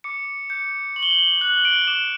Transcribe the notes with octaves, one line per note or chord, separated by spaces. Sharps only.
D6 C#7
G6 C#7
C#6 F#7
G7
F#7
G7
F#6 F#7
D7
D6 E7